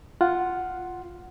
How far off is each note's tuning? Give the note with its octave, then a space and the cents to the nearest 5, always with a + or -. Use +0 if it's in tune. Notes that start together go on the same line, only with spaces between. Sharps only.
F4 +0 F#5 +0